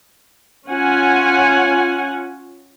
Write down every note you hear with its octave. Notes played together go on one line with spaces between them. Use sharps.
C#4 F4 F#5 G#5